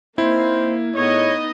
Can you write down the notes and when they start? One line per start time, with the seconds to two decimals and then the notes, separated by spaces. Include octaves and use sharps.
0.18 A#3 C4 D#4 E4 C5
0.95 A2 B3 D#4 G#4 C#5 D#5